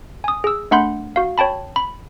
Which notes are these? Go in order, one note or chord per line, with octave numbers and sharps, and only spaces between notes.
G#5 D#6
G#4 E6
A3 D4 F#5 B5 C6 G6
F#4 F5
C#5 G5 A5 B5
B5